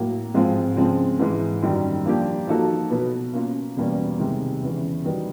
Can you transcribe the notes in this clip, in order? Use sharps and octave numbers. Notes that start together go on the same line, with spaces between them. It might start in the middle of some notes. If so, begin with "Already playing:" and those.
Already playing: A2 F#3 A#3
G#2 F3 G#3 C4 F4
C#3 F3 G#3 C4
G#2 E3 G#3
F#2 D#3 G3
F3 A#3 D4 G4
F3 A#3 D#4 F#4 A4
B2 F#3 B3
A#3 C#4 F4
E2 B2 G3 A#3 C#4
C3 D#3 G#3
E2 C#3 E3
G2 D#3 F#3 B3